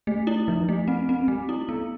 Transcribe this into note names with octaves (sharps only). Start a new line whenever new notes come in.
A3
E4
F3
A3
C4
C4
A3
E4
B3